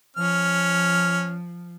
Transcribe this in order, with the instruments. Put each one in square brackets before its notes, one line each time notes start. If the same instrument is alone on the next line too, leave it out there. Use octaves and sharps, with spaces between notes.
[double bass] F3 [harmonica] C#4 F6